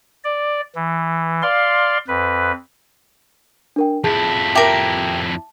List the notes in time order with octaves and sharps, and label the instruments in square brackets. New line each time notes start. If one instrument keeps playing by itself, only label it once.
[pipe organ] D5
E3
D5 F5 C6
F2 B4
[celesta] D4 A#4 G5
[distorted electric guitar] F2 E4 [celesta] G#4 [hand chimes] A5
[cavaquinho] G4 A#4 [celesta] E5 D6